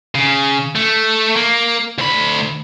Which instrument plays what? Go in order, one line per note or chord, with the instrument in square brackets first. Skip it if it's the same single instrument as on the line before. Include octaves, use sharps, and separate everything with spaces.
[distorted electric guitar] C#3
A3
A#3
D2 B5